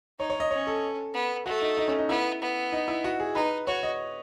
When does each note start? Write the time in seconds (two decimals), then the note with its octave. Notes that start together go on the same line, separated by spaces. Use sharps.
0.19 D#4 C#5
0.30 C#5
0.40 D#5
0.51 C#4 C#5
0.67 A4
1.14 B3
1.46 A3 F#4
1.62 D#4
1.77 D#4
1.88 C#4
1.99 D#4
2.09 B3 E4
2.41 B3
2.72 D#4
2.88 E4
3.04 F#4
3.20 G#4
3.35 D#4 B4
3.67 F#4 C#5
3.83 D#5